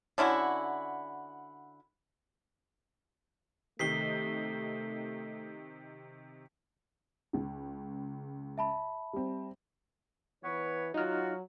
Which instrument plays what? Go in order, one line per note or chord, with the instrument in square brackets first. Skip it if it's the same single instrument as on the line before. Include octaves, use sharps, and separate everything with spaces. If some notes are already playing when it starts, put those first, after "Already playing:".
[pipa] D3 C#4 E4 F#4
[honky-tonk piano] C3 D#3 D#4 [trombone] A3 [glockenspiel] B6 C7 G7
[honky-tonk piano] C#2 C#3
[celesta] E5 A5 B5
[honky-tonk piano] G3 C4
[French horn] E3 [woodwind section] B3 B4 C#5
[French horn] F#3 [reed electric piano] D#4 F6 [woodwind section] F4 F#4